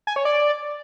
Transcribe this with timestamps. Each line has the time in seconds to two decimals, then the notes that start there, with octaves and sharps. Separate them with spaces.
0.07 G#5
0.16 C#5
0.25 D5